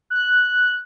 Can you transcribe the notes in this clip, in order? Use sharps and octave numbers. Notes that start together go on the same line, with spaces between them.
F#6